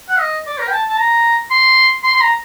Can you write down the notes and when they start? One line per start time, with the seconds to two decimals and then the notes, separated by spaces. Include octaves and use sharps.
0.09 F#5
0.19 D#5
0.47 D5
0.59 A#4
0.67 G5
0.73 A5
0.88 A5
0.98 A#5
1.51 C6
2.03 C6
2.14 C6
2.21 A#5